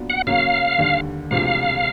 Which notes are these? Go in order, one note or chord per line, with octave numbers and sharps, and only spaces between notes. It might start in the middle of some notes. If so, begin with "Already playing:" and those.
Already playing: A#2 F#3 B3 D4
F#5
C#3 F#3 A#3 C#4 F5
D#2 D3 G3
E1 D2 C3 F3 F5